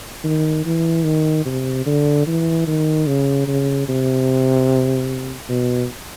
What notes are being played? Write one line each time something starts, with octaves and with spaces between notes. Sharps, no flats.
D#3
E3
D#3
C3
D3
E3
D#3
C#3
C#3
C3
B2